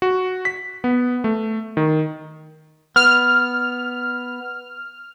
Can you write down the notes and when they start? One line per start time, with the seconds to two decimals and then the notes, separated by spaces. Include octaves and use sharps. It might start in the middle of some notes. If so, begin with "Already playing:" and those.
0.02 F#4
0.45 B6
0.84 B3
1.24 A3
1.77 D#3
2.96 B3 F6